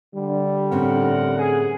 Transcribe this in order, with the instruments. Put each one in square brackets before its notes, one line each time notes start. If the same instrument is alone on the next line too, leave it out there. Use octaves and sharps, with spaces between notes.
[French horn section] D3 [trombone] G3
[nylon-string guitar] A2 C4 C#4 [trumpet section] A#4 F#5
[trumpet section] G#4